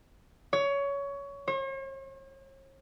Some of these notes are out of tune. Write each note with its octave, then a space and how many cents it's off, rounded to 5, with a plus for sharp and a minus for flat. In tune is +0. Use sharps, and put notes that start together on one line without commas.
C#5 +20
C#5 -45